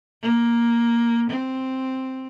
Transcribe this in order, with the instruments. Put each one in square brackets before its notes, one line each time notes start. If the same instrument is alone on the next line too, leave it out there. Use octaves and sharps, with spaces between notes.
[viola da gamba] A#3
C4